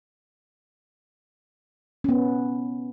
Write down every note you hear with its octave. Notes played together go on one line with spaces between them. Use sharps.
B3 C#4